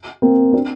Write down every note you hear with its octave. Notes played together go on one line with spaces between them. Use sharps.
A#3 C4
C4 D4